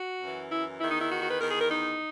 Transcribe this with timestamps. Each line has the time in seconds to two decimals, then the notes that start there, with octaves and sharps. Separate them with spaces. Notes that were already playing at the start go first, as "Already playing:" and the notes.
Already playing: F#4
0.22 F#2 E3
0.51 E4
0.80 E2 D#3 E4
0.90 D#4
1.01 E4
1.10 F#4
1.21 F#4
1.31 B4
1.40 E2 D#3 A#4
1.51 G#4
1.60 A#4
1.70 D#4